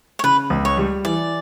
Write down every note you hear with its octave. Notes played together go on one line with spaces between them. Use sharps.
C#5
C#3 B4
C#2
C#5
G3
E3 D5